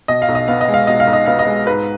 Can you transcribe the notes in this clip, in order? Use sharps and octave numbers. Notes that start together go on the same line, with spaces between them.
B2 D#5
F5
B1
D#5
B3 F5
D#5
G#3
F5
B2 D#5
F5
B1
D#5
B3 F5
D#5
G#3
G#2 B4